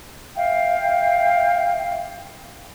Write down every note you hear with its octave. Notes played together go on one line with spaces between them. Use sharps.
E5 F5 G5